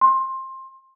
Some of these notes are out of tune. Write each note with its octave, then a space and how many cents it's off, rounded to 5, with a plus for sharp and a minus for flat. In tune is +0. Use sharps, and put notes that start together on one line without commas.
C6 +20